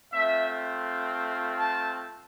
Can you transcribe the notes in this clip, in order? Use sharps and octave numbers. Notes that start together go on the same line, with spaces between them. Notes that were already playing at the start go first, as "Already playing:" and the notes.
A3 C4 F4 E5
A5